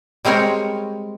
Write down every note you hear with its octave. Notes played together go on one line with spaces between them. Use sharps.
G3 G#3 C4 A#4 C#5